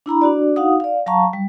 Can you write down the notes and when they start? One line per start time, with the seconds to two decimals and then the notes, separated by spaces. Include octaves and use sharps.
0.06 D4 E4 A#5 B5
0.21 D4 F#4 D5
0.56 D#4 F#4 F5 F#5 D#6
0.80 D5 F5
1.06 F#3 F5 A5 A#5 C#6
1.33 G3